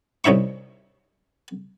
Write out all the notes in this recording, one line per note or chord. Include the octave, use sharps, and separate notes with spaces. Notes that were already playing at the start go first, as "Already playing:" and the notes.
C2 C#4 D#4 E5 C#6